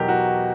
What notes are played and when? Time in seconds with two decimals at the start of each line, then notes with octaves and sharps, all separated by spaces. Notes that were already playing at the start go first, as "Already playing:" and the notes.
Already playing: E2 B2 F#3 G4 A#4
0.09 F#4